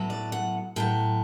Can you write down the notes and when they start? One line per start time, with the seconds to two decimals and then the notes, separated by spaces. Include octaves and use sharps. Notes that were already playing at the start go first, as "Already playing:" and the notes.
Already playing: A2 F#3 B3
0.10 D5
0.32 F#5
0.76 A2 F#3 B3 G5